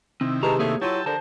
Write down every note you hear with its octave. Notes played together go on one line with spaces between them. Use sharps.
C3 D#3 C4 E4
G#3 G4 B4 A5 A#5
A3 A#3 G#4 C#5
F#3 E4 F4 G5 A5 E6
D3 A#4 C5 A5